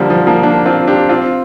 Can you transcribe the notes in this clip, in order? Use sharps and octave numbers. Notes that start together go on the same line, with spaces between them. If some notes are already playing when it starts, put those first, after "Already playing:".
Already playing: D3 F3 G3 A#3
F3
F3 A#3
A#3 D4
C4 F4
D4 G4
C4 F4